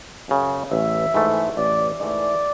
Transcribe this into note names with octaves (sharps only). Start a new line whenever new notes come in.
F#2 C#3
A1 E5
G#2 E3 A3
A1 D5
G#2 E3 A3 D5